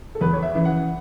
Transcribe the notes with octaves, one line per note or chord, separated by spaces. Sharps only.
A4
E2 B4
C#5
E5
C#3 E3
F#5